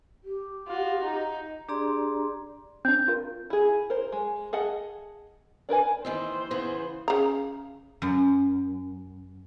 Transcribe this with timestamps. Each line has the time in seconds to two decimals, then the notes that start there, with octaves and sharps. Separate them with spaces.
0.24 G4
0.67 F4 F#4
1.03 D#4
1.69 D4 G4 G#4 D5 A#5 C6
2.85 C4 D4 G6
3.08 F4 A#4
3.50 E4 G#4
3.90 A#4 C5
4.12 G#3
4.53 G#4 D#5 F#5 A5
5.69 D4 A#4 B4 G#5
6.05 D#2 D#3 E3 C5
6.51 C#3 E3 B3
7.08 C#3 A#5
8.02 F#2